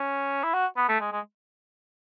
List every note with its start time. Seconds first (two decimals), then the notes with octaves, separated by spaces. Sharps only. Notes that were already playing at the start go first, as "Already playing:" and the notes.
Already playing: C#4
0.43 E4
0.54 F#4
0.77 B3
0.89 A3
1.00 G#3
1.12 G#3